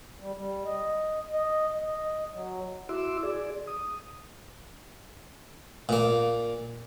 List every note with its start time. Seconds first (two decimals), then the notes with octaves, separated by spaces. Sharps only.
0.20 G3
0.36 G3
0.65 D#5
1.33 D#5
1.86 D#5
2.33 F#3
2.89 E4 F#4 E5 C6 D6 E6
3.23 G#4 D5
3.67 D#6
5.89 A#2 A#3